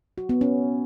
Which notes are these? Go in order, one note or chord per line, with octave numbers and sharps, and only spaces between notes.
F#4
B3
C#4